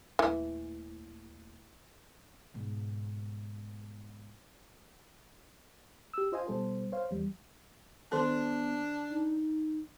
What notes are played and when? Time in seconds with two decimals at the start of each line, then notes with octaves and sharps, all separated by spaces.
0.19 D#1 E3 A3
2.54 G#2 B2
6.14 G4 E6
6.32 F4 C5 D#5 F5 G#5
6.47 B2 G3 A4 C5
6.92 C5 C#5 F5
7.11 E2 G3
8.12 D#3 B3 D4 A4
9.10 D#4